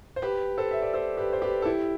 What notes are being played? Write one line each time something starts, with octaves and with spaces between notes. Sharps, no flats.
C5
G4 B4
A4 C5
E5
D5
A4 C5
G4 B4
C5
G4 B4
A4
E4 G4